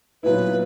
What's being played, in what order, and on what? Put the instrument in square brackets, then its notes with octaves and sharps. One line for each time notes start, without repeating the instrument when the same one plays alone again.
[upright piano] A#2 F#3 B3 E4 [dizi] B4